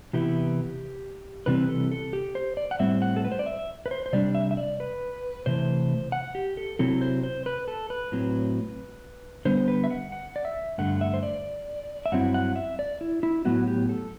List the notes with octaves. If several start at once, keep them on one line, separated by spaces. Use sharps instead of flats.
C3 E3 B3 E4 G4
C3 E3 G3 C4 B4
A4
A4
G4
C5
D5
F#5
A2 G3 C4 E5
F#5
A4
B4
C5
D5
E5
B4
C5
C5
C3 G3 D4 D5
E5
E5
D5
B4
C3 E3 A3 C5
F#5
G4
A4
C3 F#3 C4 E4 A4
C5
C5
B4
A4
B4
A2 F#3 C4
D3 G3 B3 C5
B4
E5
F#5
F#5
D5
E5
G2 D3 A3 F#5
E5
C5
D5
E5
G2 F#3 C4 E4 F#5
F#5
E5
D5
E4
E4
A2 F#3 B3 E4 F#4
G4
A4